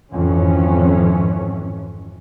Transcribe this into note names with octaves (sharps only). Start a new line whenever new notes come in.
G#1 F2 E3 C#4